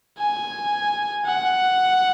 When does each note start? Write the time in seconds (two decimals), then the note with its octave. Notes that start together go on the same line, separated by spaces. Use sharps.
0.19 G#5
1.26 F#5